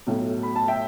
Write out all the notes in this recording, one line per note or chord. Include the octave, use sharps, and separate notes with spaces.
B1 A2 F#3 A3
B5
A5
E5 G5